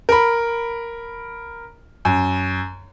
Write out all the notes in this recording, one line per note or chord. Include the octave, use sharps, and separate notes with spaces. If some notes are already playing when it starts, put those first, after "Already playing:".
A#4 B5
F#2